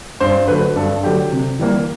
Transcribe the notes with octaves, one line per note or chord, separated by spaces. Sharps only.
G2 C5
D3 F#3 A3 B4
G2 A4
D3 F#3 A3 G4
C3
E3 G3 A#3